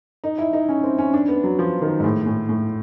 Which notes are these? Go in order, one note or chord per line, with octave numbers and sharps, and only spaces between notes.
D#4
E4
D#4
C#4
C4
C#4
D4
B3
F#3
F3
D#3
G#2
A2
A2
A2